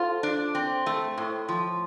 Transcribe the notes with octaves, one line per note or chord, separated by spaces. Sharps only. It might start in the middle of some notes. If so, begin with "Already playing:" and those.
Already playing: F4 A4 C5
D4
C4
A3
A2
F3